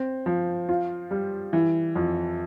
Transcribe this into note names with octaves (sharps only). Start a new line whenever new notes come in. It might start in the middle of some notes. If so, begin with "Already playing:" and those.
Already playing: C4
F3
F4
G3
E3
F2